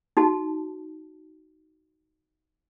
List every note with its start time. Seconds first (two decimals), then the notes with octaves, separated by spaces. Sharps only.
0.17 D#4 F#4 A5